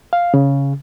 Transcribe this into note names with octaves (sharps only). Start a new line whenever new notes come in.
F5
C#3